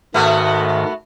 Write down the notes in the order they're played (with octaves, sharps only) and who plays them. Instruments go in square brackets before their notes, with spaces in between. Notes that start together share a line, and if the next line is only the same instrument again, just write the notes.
[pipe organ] G#2 D#3 [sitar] A3 B3 F#4